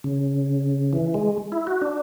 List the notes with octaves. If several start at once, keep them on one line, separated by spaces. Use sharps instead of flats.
C#3
E3
G#3
E4
F#4
D4